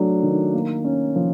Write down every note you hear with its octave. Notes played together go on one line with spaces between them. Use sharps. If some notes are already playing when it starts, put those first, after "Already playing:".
Already playing: F#3 A3 D4
D#3
A#3
C#4
F3